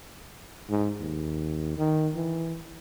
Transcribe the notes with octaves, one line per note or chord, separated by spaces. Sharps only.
G#2
D#2
D#3
E3